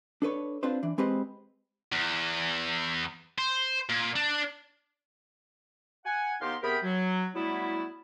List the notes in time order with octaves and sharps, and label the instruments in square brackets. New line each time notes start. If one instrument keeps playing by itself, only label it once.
[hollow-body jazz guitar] D4 A4 B4 C#5
C4 D4 F4 B4 C5
E3 D4
G#3 C4 G4 B4 C5 D#5
[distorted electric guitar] E2
C5
A#2
D4
[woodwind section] F#5 G#5
D#2 B3 D#4 G4 F5 C6
C3 B3 G#4 A#4 G5 B5
F#3
F#3 G3 A3 B3 E4